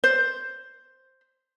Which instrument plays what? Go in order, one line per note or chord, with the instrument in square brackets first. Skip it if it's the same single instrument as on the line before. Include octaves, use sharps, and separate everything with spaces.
[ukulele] C5